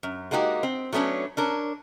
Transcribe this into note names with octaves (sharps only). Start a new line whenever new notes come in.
F#2
G#3 A#3 D#4 F#4 G4
C4
F#3 A3 B3 C#4 D4
C#4 D4 A#4